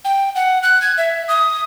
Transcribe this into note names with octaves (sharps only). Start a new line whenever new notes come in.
G5
F#5
F#6
G#6
E5
D#6